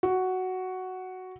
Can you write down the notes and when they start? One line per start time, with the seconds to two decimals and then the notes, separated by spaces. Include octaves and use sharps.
0.03 F#4